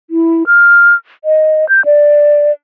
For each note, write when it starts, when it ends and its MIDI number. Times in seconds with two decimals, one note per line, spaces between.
0.10 0.43 64
0.47 0.94 89
1.25 1.68 75
1.69 1.84 91
1.85 2.52 74